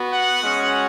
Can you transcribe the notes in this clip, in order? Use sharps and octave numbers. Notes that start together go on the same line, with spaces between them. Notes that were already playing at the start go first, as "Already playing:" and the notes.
Already playing: B3 F#4
F#5
G#3 C#4 F#4